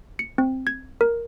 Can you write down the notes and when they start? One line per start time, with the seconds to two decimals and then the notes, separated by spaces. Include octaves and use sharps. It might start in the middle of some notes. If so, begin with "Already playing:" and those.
0.19 C#7
0.38 C4
0.67 G#6
1.01 A#4